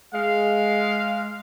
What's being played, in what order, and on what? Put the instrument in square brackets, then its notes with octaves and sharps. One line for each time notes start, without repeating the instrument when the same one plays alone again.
[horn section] G#3 F5